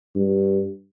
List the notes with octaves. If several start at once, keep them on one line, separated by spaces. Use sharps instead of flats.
G2